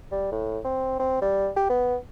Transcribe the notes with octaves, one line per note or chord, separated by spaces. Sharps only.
G3
A2
C4
C4
G3
G4
B3